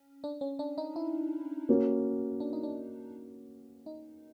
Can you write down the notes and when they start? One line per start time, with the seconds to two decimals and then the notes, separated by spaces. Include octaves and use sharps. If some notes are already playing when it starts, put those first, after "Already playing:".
Already playing: C#4
0.24 D4
0.41 C#4
0.59 D4
0.78 D#4
0.96 E4
1.69 A#3 C#4 F#4
2.40 D4
2.53 D#4
2.63 D4
3.86 D#4